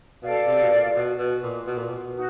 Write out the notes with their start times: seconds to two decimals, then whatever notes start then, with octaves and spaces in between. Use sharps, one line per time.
0.22 B2 A4 D5 F5
0.47 C3
0.62 B2
0.71 A#2
0.95 B2
1.19 B2
1.43 A#2
1.66 B2
1.78 A#2
1.89 B2
2.14 D#4 F#4